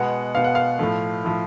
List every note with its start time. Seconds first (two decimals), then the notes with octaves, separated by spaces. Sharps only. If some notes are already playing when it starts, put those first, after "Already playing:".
Already playing: B2 G#3 B3 F#5
0.35 B2 G#3 B3 F5
0.44 F#5
0.55 F5
0.79 A2 F3 A3
1.25 A2 F3 A3